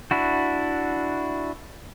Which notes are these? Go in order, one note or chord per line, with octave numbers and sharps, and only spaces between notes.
D4 E4 F#4